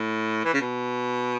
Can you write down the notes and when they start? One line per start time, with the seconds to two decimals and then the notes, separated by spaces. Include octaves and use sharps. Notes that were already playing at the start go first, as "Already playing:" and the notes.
Already playing: A2
0.45 E3
0.53 C#3
0.61 B2